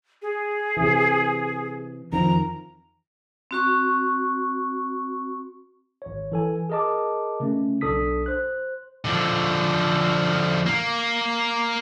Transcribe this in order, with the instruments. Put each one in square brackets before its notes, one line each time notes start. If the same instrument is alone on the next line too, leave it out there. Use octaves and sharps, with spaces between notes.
[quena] G#4
[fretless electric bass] C3 E3
[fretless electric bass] F2 D#3 F3 [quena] A#5
[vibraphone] C4 F#4 C#6
[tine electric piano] G#1 C#5
E3 A4 G#5
G#4 A#4 D#5 A5 D6
C#3 A3 C#4
B1 D4 A4 D#6 B6
C5 F#6
[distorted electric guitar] D3 F3
A#3